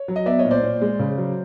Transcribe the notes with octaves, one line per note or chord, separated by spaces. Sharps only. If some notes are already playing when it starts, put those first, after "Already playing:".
Already playing: C#5
F#3
D#5
B3 D5 E5
C#5 D#5
A#2
C5 D5
A#2
G#3
C#3
F#3